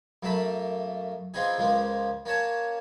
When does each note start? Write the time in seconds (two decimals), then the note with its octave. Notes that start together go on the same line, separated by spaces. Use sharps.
0.23 F#2 A3 A#3 A5 B5
1.34 F3 B3 C4 D#4 G#4
1.58 C#2 F3 G#3 A#3
2.26 A#3 C#4 C#5 A5